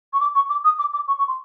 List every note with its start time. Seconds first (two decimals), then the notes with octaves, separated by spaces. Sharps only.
0.13 C#6
0.20 D6
0.35 C#6
0.49 D6
0.64 D#6
0.78 D6
0.93 D6
1.07 C#6
1.18 C#6
1.27 C6